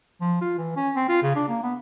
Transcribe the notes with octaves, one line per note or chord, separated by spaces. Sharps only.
F3
F4
E3
C#4
C4
F4
C#3
D4
A#3
B3